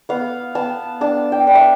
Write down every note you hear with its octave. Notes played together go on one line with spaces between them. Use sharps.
B3 F5
B3 A5
D4 A5
G5
D4
E5